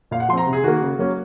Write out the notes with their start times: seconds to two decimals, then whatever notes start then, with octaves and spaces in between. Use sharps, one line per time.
0.11 A#2 F5
0.20 F#5
0.29 F3 C6
0.33 C4 A#5
0.47 C3
0.53 G#4
0.64 D#3 A#3 F#4
0.82 C#3
0.98 F#3 A#3 C#4